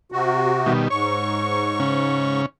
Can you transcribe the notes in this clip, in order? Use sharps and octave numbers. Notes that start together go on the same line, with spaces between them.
C3 F#4
B2 D#3 G3
G#2 C#5 C#6
C#3 C#4